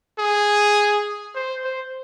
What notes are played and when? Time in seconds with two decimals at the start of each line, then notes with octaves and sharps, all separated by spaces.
0.19 G#4
1.35 C5
1.64 C5